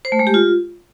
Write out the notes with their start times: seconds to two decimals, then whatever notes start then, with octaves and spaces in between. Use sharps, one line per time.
0.05 C5
0.12 A3
0.19 G#3
0.27 G4
0.34 F4